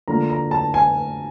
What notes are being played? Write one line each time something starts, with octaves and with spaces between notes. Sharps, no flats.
D3 F3 A#3 A#5
A#5
A5
G#5